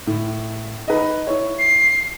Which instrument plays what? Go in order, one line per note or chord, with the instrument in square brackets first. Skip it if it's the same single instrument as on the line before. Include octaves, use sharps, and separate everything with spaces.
[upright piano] A2
D#4 B4 D#5
E4 C#5
[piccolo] C7